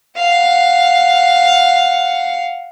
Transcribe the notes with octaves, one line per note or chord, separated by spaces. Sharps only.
F5 F#5